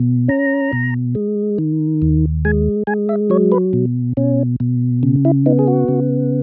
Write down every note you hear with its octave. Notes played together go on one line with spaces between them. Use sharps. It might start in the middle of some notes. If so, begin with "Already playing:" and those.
Already playing: B2
C#4 A#5
B2
G#3
D#3
D#2
G#3 G#5
G#3 G#5
E5
F#3 C#5
B4
B2
B2 C#4
B2
C#3
E4
B3 D#4
G#4
F#4
C#3